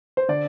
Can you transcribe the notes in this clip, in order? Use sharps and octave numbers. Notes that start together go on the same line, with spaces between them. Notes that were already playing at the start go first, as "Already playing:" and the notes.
C5
D3 D5